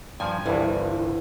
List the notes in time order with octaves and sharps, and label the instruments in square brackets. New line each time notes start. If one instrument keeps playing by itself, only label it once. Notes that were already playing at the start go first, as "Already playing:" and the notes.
[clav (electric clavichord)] G2 F3 [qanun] G#5
[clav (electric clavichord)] G1 C2 G2 [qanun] E3